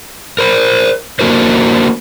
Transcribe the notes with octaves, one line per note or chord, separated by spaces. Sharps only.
A#4 C5
A#3 D4 F#4 A#4 C5